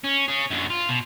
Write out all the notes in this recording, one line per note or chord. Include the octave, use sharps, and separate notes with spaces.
C#4
C#4 G#4
F#2 D3
F4
B2